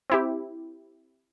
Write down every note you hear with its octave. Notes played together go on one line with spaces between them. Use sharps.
C4 E4 G4